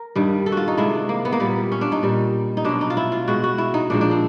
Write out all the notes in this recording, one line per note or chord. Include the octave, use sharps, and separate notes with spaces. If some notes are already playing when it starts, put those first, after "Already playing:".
Already playing: A#4
G2 D#3 G3
A4
F#4
F4
D#4
C3 D#3 G#3 E4
A#3
B3
A#3
A#2 G3 B3
C#4
D4
D#4
A#2 G3
D#4
B2 F#3 D4
D#4
F4
E4
F4
B2 G#3 F#4
F#4
E4
D#4
A#2 F3 G#3 D4
D4
C4